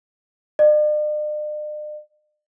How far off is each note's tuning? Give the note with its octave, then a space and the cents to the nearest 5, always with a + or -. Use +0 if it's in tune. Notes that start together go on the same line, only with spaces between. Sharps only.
D5 +45